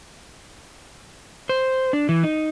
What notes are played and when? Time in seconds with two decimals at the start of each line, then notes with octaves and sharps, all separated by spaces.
1.49 C5
1.93 D4
2.09 E3
2.23 D#4